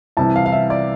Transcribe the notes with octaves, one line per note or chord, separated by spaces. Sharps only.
C2 C3 E3 A5
F5
F5
E5
D5